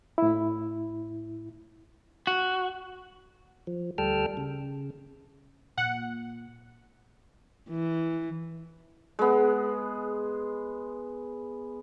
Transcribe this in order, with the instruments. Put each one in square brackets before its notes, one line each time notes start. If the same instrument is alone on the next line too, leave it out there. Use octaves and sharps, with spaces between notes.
[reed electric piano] A2 E4
[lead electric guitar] F#4
[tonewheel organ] F3
D2 G3 A4 G5 A5 F6
C#3
[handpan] A#2 [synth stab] F#5
[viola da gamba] E3
[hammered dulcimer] G#3 B3